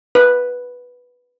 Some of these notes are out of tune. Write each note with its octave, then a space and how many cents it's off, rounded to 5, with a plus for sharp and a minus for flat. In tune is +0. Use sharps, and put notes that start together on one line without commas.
B4 -5